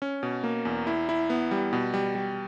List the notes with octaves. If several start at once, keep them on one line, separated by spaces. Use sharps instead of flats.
C#4
B2
A#3
E2
E4
E4
B3
G3
B2
G3
G3